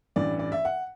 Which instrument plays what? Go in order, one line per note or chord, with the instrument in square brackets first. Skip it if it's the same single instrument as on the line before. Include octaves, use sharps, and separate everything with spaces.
[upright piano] A1 G2 E3 D5
D5
E5
F#5